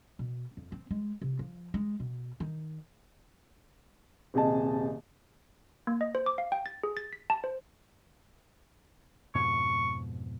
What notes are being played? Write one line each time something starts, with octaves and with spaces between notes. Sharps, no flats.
B2
F2
C4
G#3
C3
F3
G#3
B2
D#3
D#1 C3 G#4 D#5 A5
A#3
D#5
C5
D6
F5
G5
A6
G#4
A6
B6
A5
C5
F2 G#2 B2 C#6